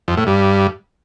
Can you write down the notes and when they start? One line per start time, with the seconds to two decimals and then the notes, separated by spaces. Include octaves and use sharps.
0.08 F2
0.17 A2
0.27 G2